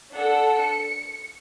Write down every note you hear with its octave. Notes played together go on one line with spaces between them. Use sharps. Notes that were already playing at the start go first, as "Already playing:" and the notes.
D4 A4 F#5
C#7